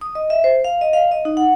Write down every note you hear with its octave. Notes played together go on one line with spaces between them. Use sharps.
D#6
D#5
E5
C5
F5
D#5
F5
D#5
D#4
F#5